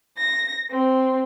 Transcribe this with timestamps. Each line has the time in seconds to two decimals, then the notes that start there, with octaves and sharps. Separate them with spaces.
0.16 A#6
0.69 C4